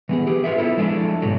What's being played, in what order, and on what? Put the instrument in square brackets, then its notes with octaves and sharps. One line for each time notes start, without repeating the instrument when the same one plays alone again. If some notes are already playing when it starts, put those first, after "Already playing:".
[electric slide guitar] E3 B3 G#4
G4 G#4 B4
F4 F#4 G#4 E5
B3 E4 A4 C5 E5
F3 G#3 D4 E4 A4
G#2 B2 D3 F#3